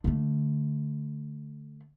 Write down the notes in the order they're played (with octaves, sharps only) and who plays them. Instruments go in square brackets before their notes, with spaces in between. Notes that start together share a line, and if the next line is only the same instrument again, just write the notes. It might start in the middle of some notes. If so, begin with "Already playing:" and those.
[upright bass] D3 A3